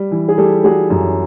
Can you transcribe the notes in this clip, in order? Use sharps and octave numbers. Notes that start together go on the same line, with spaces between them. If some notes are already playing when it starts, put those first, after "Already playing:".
Already playing: G3
E3
G#4
G3 G4 A4
G3 F#4 G#4
F#2